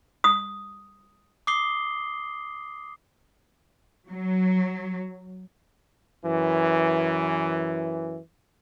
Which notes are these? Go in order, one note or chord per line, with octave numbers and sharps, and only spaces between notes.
D#6
D6 D#6 C7 G7
F#3
F#2 E3